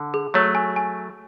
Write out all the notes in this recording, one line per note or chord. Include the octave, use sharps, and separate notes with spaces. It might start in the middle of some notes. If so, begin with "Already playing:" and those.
Already playing: D3
G#4
F#3 A3 C#5
G#5
G#5